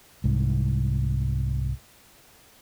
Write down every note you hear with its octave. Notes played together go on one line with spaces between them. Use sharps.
C2 G#2